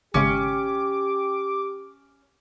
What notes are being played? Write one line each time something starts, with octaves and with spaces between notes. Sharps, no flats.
G#1 C#3 G#3 C#4 G4 D6